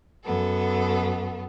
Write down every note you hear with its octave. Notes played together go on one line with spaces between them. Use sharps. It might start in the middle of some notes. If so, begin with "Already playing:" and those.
F#2 B3 A4